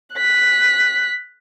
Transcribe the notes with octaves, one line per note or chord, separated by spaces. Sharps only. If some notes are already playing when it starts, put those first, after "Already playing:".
F#6 B6